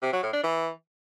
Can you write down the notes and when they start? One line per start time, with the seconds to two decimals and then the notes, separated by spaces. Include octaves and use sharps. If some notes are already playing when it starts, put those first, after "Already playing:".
0.03 C3
0.13 F#3
0.23 A2
0.33 D4
0.43 E3